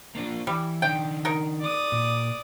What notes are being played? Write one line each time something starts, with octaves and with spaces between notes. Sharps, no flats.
A#3 D4 F4
E3 G3
D#3 D4 G5
D#4 A#4
D5 D#6
A#2